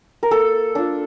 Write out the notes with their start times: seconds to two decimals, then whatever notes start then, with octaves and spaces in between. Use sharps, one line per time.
0.23 A#4
0.31 A#3 A4
0.75 D4 F4